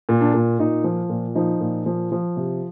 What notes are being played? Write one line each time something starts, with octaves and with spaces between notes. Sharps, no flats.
A#2
D4
A#2
A#2 D#4
F3
A#2
F3 D#4
A#2
F3
F3
C3